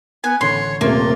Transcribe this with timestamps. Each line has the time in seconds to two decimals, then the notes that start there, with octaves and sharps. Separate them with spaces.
0.24 B3 G#5
0.41 A1 D3 C#5 C6
0.81 D#1 C3 A3 A#3 F4